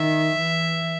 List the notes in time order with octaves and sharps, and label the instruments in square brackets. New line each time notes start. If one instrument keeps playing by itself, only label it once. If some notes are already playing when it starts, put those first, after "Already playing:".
Already playing: [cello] D#3 [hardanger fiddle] E5
[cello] E3